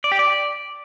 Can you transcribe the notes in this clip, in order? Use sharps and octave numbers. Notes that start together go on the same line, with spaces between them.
D5
G4
D5